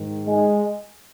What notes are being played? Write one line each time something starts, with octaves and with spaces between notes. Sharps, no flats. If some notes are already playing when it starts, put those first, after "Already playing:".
Already playing: G#2 D#3
G#3